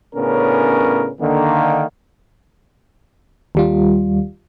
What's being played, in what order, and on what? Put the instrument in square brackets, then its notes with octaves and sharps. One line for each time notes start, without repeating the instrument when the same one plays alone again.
[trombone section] A2 C#3 B3 C#4 D4 A#4
D3 D#3 A#3
[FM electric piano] D#2 G3 F4